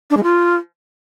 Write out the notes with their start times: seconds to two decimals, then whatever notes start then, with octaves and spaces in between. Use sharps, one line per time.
0.10 D4
0.17 G#3
0.23 F4